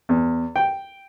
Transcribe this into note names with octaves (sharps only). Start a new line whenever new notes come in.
E2
G5